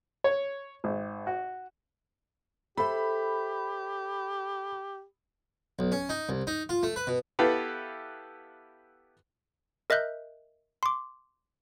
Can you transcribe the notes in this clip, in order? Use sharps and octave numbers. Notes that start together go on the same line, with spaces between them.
C#5
G#1
F#4
G4 A4 C5 E5 B5
B1
C#4
D#4
C2
D#4
F4
A3
B4
B2
B3 E4 G4 A4 B4 F5
A#4 D#5 E5 F#6 G6
C6 D6